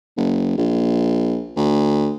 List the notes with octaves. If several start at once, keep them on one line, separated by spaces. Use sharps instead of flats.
F#1
A#1
D2